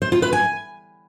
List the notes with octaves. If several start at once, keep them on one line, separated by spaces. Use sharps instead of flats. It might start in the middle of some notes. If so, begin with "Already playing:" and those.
C5
F4
B4
G#5